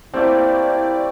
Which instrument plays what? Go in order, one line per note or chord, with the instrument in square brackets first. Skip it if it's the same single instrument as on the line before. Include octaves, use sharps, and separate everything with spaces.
[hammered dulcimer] A3 A#3 G4 [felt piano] C4 [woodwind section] E4 [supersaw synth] D5